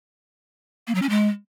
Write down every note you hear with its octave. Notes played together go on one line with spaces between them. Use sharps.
A#3
F#3
C#4
G#3